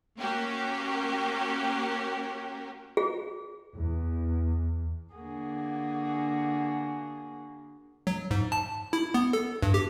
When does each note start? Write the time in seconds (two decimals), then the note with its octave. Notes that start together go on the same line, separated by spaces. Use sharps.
0.18 A#3 C#4 F#4 G4 A#4
2.97 G#4
3.75 E2
5.16 D3 A#3 F#4 G#4
8.07 F#3
8.31 G#2
8.52 A5
8.93 E4
9.14 B3
9.33 A4
9.62 G2
9.74 G4